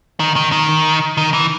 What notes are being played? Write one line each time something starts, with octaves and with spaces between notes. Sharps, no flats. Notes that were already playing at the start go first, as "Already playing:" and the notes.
D#3
D#3
D#3
D#3
E3